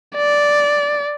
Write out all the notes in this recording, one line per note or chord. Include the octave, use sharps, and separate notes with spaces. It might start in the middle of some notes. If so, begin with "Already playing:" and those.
D5